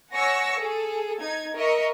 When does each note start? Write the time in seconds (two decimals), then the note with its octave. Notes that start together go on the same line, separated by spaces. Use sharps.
0.12 C#5 F#5 G#5 C#6 E6 A#6
0.58 G#4 A4
1.17 D#4 G#6
1.54 A#4 D#5 E5 C#6